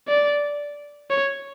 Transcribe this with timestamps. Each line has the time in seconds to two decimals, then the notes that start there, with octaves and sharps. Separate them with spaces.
0.08 D5
1.10 C#5